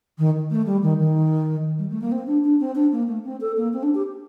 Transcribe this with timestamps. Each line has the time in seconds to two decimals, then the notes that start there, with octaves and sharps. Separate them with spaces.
0.18 D#3
0.50 A3
0.65 G3
0.82 D#3
0.99 D#3
1.78 G3
1.90 A3
2.01 A#3
2.11 C4
2.26 D4
2.44 D4
2.60 C4
2.75 D4
2.91 A#3
3.07 A3
3.24 C4
3.40 A4
3.56 A#3
3.73 C4
3.82 D4
3.94 G4